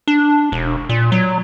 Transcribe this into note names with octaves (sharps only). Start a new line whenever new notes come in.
D4
E1
A#2
F#3